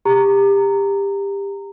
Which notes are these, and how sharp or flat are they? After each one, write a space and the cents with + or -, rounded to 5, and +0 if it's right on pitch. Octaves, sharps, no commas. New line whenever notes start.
G4 +25 A#5 -15